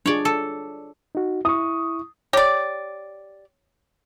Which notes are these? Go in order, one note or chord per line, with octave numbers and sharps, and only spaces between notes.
D4 F4 G#4 C#5 D5
A4
D#4 F#4
E4 C#6 D#6
G4 C#5 D5